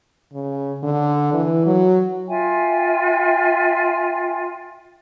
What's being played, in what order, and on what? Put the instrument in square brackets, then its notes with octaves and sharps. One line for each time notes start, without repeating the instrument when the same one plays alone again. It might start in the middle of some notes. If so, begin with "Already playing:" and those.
[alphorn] C#3
D3
E3
F#3
[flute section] F4 E5 G5 G#5